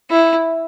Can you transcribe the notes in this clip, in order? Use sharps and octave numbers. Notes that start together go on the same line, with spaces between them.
E4